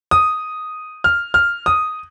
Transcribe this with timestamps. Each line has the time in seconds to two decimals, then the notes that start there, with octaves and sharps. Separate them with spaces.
0.11 D#6
1.04 F6
1.34 F6
1.66 D#6